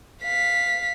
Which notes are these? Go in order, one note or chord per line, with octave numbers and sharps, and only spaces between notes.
F5 B6